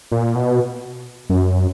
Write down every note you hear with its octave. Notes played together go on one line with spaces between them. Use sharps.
A#2
B2
F#2